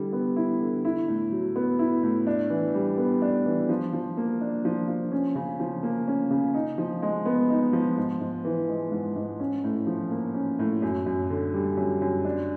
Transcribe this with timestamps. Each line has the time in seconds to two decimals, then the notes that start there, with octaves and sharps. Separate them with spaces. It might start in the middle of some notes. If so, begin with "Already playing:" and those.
Already playing: D3 G3 E4
0.13 B3
0.36 E4
0.61 D3
0.85 E4
1.08 A2
1.32 F#3
1.56 B3
1.79 E4
2.03 A2
2.27 D4
2.50 E3
2.74 G3
2.98 B3
3.22 D4
3.46 E3
3.69 F3
3.93 F3
4.17 A#3
4.41 D4
4.65 F3
4.88 F3
5.12 C#4
5.35 C#3
5.60 F3
5.83 A#3
6.08 C#4
6.30 C#3
6.54 D#4
6.78 F3
7.02 G#3
7.26 B3
7.50 D#4
7.73 F3
7.97 G#2
8.21 G#2
8.45 E3
8.69 G#3
8.92 G#2
9.16 G#2
9.40 C#4
9.64 A2
9.87 F3
10.11 A#3
10.34 C#4
10.59 A2
10.82 F#2
11.06 F#2
11.30 D3
11.54 G3
11.77 F#2
12.02 F#2
12.25 D4